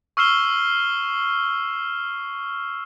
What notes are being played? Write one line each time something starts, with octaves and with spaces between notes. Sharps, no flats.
C#6 E6 F6 C7 E7 G7